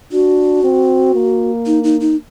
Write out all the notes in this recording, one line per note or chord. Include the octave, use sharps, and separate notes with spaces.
D4 F#4
C4
A#3
D#4
D#4
D#4